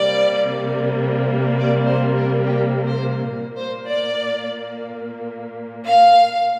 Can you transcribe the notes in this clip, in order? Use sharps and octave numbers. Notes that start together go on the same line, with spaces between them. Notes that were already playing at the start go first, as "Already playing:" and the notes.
Already playing: C3 G3 A#3 D5
D5
C5
A#4
G4
C5
A#2 A#3
C5
D5
F5